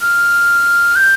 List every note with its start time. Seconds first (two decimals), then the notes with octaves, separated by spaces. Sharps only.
0.01 F6
0.96 G6